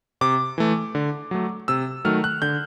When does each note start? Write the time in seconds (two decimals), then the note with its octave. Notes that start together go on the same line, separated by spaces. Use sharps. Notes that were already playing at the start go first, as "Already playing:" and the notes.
0.21 C3 D6
0.58 E3 A3
0.95 D3
1.31 F#3 A3
1.68 C3 E6
2.05 D#3 F#3 A3 F6
2.24 F#6
2.42 D3 G6